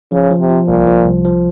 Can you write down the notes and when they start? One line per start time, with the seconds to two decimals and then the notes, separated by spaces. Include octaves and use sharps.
0.12 C#3 F3
0.31 F3
0.40 C3
0.50 F3
0.68 C2 A#2
0.87 F3
1.05 C2
1.25 F3